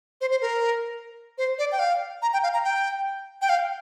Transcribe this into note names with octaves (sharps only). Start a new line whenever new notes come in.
C5
C5
A#4
C5
D5
G5
F5
A#5
G5
F5
A#5
G5
G5
F5